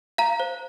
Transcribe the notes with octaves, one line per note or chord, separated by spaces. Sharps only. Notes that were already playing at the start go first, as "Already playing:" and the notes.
F5 A#5
C5